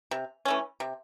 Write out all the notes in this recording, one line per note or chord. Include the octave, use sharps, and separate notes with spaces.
C3
E3 A3 C#4
C3